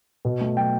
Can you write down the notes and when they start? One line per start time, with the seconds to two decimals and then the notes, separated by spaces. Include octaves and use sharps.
0.25 B2
0.41 A3
0.57 F#3 G5